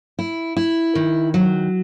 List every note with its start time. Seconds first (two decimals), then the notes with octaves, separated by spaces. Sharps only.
0.19 E4
0.57 E4
0.95 D#3
1.34 F#3